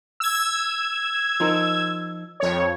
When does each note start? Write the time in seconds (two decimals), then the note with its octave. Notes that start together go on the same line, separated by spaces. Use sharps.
0.20 E6 G#6
1.40 F3 D#4 A#4
2.40 F2 C#5